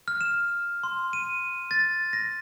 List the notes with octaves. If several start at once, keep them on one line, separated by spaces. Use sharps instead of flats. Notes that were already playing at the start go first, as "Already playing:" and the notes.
F6
E7
C6
D#7
A6
A#6